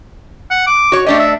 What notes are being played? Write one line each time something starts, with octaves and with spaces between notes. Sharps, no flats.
F#5
D6
F#4 C#5
A3 D4 G4 D#5
E5